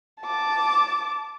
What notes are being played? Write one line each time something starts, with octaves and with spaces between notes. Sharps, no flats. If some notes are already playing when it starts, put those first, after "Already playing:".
A5 D6